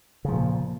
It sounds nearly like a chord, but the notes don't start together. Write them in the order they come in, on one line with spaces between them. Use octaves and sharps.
C#3 F3 A#2